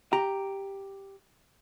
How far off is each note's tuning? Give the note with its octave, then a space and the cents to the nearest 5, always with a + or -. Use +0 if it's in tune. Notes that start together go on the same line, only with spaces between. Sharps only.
G4 +0 A#5 +0